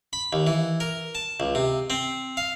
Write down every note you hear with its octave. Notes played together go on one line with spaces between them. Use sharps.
B5
D#2
E3
A#4
A5
C#2
C3
C4
F5